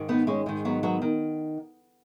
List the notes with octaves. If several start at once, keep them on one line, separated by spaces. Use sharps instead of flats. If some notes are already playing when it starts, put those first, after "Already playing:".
Already playing: G#2 D#3
B3 D#4
G#3 C#4
G#2 D#3 G#3
F#3 B3
F#3 B3
D#3